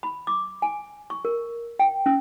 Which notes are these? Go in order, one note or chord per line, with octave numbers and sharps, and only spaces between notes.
B5
D6
G#5
C#6
A#4
G5
C#4